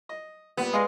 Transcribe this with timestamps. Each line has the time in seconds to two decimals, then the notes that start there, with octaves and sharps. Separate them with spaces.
0.09 D#5
0.57 A#2 G3 B3
0.73 G#3 D5 D#5 F5